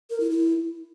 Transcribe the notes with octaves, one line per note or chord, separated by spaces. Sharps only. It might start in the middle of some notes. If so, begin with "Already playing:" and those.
A#4
E4
E4